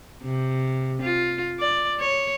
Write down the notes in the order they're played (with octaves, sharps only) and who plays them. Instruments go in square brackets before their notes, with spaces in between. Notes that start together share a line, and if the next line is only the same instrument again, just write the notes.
[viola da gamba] C3
F4
D5
C#5